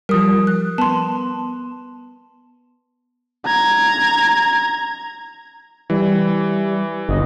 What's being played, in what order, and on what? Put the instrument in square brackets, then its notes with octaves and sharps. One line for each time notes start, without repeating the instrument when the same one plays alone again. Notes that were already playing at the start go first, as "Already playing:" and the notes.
[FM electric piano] F3 G3 [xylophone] A#4 D#6
[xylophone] F#6
[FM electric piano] B3 [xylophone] A5 C6
[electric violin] A#5 G#6
[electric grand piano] E3 [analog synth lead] G3
[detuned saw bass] G1 [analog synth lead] D#5